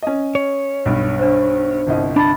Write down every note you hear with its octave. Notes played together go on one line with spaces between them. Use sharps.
C#4 D#5
C#5
B1 G2
D4 C5
G1 C2 D#5
D4 A5 B5 A6